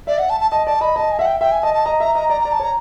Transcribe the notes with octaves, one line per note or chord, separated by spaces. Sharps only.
D5 E5
F#5
A5
A5
D#5 A5
D5 A5
D#5 B5
D#5 A5
G#5
E5 F#5
G5
E5 G5
G#5
D#5 A5
A5
D#5 A#5
E5 A#5
D#5 A#5
D5 A#5
D5 A#5
A5
C#5 A#5